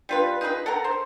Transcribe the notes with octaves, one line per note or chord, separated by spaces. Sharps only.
G3 F4 B4
D#4 F4 G#4 B4
A4 A#4 F#5 A#5
C5